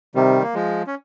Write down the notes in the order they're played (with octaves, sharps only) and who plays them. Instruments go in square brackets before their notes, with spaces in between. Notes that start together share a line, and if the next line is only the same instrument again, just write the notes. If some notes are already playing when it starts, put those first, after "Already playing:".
[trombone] C3 [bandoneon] D#3 G3
[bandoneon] A#3
F3 G#3
C#4